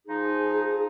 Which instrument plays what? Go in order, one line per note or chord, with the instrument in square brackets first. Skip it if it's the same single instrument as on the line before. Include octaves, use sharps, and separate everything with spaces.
[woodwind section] F3 D#4 [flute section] G#4